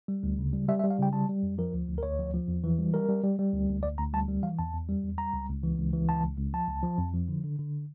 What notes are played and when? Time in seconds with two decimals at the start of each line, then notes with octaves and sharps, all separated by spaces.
0.08 G3
0.23 D2
0.39 C#3
0.53 G3
0.68 G3 E5
0.80 E5
0.84 G3
0.90 F5
0.98 C#3 G5
1.13 G3 A5
1.29 G3
1.43 F2
1.58 F3 A#4
1.73 D2
1.88 D2
1.98 A#4
2.03 D2 C#5
2.19 F3
2.34 F3
2.48 E2
2.64 E3
2.79 G3
2.94 G3 A#4
3.08 G3
3.23 G3
3.39 G3
3.53 D2
3.69 D2
3.83 D2 D5
3.98 D2 A#5
4.13 G3 A5
4.28 G3
4.43 E3 F5
4.59 E2 A5
4.74 E2
4.89 G3
5.04 E2
5.18 G3 A#5
5.33 C#2
5.49 C#2
5.63 E3
5.78 C#2
5.93 E3
6.08 C#2 A5
6.24 C#2
6.38 C#2
6.53 F3 A5
6.68 C#2
6.83 F3
6.98 F2
7.13 F3
7.28 D3
7.44 D3
7.59 D3